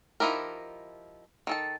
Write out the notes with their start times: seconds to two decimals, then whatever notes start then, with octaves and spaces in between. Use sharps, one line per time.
0.20 F3 D#4 E4 G4 A#4
1.47 D#3 A4 A5